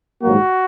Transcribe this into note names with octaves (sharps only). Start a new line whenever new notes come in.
A#1 G#2 D#3 F#3 A#3 F#4